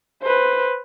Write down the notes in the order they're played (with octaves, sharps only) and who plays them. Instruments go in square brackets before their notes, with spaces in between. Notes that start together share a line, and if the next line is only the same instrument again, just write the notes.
[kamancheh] B4 C5